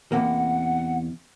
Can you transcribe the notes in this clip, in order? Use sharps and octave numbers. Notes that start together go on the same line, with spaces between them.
E2 C3 A#3 F#5